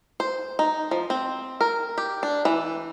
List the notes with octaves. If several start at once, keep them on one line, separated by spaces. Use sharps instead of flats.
C5
D#4
F3
C4
A#4
G4
D4
E3